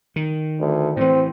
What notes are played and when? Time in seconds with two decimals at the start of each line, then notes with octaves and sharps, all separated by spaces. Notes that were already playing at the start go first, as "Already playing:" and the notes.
0.16 D#3
0.60 D2
0.97 A2 E3 C4